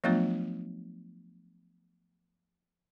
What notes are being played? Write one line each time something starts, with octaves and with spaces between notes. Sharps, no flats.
F3 F#3 A3 B3 D4 F4